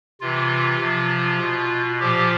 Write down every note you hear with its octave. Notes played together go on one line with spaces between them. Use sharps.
C3 E3 F4
C3 F3
B2
A#2 F3 G4